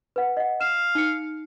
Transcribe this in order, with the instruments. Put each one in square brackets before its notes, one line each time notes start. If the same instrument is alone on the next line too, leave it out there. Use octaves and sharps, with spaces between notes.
[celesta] B4 F#5
D#5 F#5
[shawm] F5 [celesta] E7
[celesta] D#4 C#7